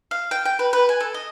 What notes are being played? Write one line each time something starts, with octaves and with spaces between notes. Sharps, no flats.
F5
G5
G5
B4
B4
G#5
A4
D#5